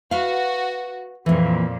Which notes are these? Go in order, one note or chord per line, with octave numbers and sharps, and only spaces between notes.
F#4 B4 F5
F2 A#2 E3 A#3